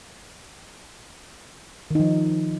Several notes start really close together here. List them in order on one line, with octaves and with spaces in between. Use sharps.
D#3 D#4 F3